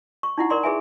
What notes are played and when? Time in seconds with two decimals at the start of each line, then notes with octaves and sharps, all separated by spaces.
0.23 C#6
0.38 D#4 E4 F#5
0.50 A#4 D5 C6
0.63 G#4 B4 E5 G#5